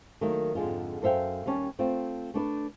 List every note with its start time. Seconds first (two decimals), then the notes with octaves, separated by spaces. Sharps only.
0.21 D#3 F#3 A3 A#3
0.55 F2 G#2 D3 G#3 F4
1.02 F#2 A4 C5 E5 F5 G5
1.46 D#2 G3 C#4 A5
1.79 A3 C4 F4
2.34 A3 D4 B4 D5